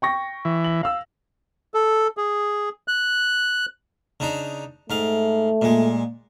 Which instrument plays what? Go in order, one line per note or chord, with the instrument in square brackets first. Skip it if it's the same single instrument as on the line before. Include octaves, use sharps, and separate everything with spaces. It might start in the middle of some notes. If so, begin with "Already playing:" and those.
[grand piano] G5 C#6 A#6
[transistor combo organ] E3
[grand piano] F#7
F5 E6
[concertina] A4
G#4
F#6
[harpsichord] C#3 D4 D#4
[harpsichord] G#2 F5 [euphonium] A3
[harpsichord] A#2 G#3